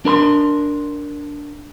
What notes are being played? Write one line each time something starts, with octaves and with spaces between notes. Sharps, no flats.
D4 A#4 B5 C6